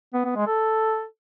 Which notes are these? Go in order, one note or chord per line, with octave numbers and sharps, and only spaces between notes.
B3
B3
G#3
A4